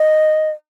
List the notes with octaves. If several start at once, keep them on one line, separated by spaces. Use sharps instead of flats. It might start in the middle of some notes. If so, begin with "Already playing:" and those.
Already playing: D#5